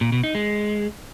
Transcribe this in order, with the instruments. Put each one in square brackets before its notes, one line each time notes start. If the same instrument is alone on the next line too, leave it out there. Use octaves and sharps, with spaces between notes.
[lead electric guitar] A#2
B2
D#4
G#3